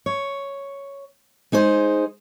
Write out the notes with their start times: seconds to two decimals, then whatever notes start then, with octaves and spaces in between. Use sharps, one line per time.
0.06 C#5
1.52 G#3 D#4 G#4 C5